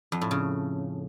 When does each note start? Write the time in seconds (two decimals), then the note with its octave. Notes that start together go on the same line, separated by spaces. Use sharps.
0.12 F2
0.21 A2
0.31 C#3